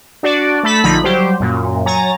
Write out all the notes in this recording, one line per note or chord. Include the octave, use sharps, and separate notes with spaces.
D4 F#4 D5
A3 A4 A5 B5 B6
A#1 D3 F3 D#4 B5
F#3 G3 G4 C5
F#2 A#2
F#3 C#5 G#5 A#5 A6